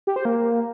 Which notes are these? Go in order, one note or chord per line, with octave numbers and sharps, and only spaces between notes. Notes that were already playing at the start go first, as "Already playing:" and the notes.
G4
C5
A#3